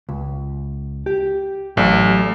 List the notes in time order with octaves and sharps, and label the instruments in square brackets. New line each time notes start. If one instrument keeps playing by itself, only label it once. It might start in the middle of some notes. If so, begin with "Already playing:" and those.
[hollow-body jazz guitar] C#2
G4
[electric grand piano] A1 [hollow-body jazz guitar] F#3 A3 D5